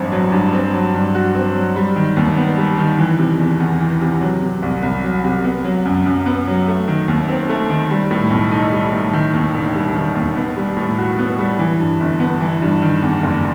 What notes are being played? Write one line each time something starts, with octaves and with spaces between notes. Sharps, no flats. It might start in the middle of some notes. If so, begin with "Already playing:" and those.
Already playing: A1 G2 F#3 C4
F#3
G2
C4
F#3
G2
F#4
C4
F#3
G3
D#3
D#2
B3
G3
D#3
E3
C3
E2
E2
E3
C3
F#3
C3
C2
C2
F#3
C3
B3
F#3
F#2
F#2
B3
F#3
A3
D#3
D#2
C4
A3
D#3
G3
A2
B1
D#4
G3
A2
D#3
D#2
E1
G3
D#3
D#2
B3
G3
A2
F#4
B3
G3
E3
G2
G1
B3
E3
G2
D#3
E2
F#1